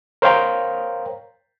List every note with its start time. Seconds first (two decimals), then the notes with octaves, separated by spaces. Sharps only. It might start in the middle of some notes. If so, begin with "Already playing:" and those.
0.22 A#4 C5 C#5 F5 G5 A#5